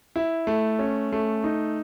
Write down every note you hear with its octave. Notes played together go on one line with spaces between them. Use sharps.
E4
A3
C#4
A3
D#4